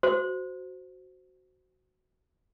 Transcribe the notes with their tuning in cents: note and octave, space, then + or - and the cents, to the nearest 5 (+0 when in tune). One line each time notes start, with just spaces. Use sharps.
F#4 +0 C5 -10